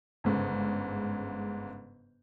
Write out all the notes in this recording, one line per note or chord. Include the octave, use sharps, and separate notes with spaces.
G1 G#2 C#3